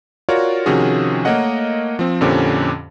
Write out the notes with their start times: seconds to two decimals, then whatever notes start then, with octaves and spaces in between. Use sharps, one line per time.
0.29 F4 F#4 A#4 C#5 D5
0.66 C3 D#3 F3 C#4 F#4 G#4
1.25 A3 A#3 A#4 C#5 D#5 F#5
1.99 F3 C4
2.21 F2 A#2 D3 C#4 G4 C5